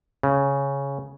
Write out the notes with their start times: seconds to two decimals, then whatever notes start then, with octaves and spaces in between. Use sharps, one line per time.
0.23 C#3